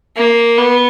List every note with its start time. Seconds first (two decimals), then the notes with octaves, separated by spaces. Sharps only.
0.16 A#3
0.58 B3